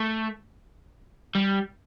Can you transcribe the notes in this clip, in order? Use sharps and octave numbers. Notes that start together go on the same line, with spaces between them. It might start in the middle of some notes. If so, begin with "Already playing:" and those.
Already playing: A3
G3